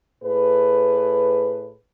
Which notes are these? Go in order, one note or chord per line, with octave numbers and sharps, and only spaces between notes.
A2 G#4 B4